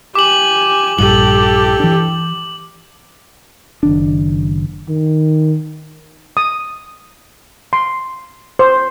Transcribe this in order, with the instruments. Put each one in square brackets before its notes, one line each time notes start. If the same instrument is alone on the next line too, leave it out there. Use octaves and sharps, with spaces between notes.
[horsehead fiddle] G4 G#5 [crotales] D6 F#7
[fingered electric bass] A#1 G2 [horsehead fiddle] G4 A4 [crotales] F#7
[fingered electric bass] E3 D4
[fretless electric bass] F#1 D#3 D4
[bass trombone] D#3
[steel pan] D#6
C6
C5